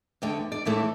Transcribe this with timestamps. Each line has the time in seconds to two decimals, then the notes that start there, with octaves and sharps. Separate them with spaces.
0.22 E2 D3 A3 G5
0.52 D5
0.65 A2 E3 A3 E4 A4